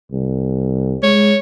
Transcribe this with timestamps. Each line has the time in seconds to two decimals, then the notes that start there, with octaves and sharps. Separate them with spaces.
0.12 C2
1.03 G#3 C#5